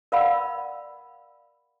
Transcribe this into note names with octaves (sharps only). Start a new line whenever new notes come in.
A#4 D5 F5 F#5 B5 E6